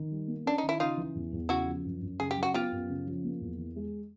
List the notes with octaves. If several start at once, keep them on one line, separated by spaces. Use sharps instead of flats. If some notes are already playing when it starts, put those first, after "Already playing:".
Already playing: D#3
G3
A#3
C#4 D4
D#3 D#4
E4
C#3 D#4 F4
E3
E2
E2
C#3 E4 F#4
F3
F#2
F#2
C#3 G#4
G4
F#3
F#4
B3 F4 G4
F#2
C#3
F3
A#3
E2
E3
G#3